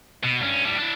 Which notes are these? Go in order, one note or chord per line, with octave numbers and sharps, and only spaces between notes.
B2
G2 C#4
A2 G3
D4 E4